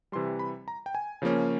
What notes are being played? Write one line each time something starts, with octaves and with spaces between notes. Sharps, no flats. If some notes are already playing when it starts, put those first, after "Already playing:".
C3 E3 G3 C6
B5
A#5
G5
G#5
C#3 F3 A#3 C#4